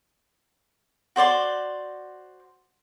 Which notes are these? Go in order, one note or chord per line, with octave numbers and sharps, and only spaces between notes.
F#4 C5 D5 C6